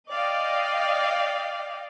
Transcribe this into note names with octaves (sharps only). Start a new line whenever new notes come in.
D5 D#5 F5 G5